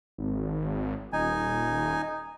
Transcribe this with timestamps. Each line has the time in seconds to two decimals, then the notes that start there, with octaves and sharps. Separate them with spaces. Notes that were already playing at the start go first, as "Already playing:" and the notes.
0.18 G#1
1.13 D#1 D#4 G#5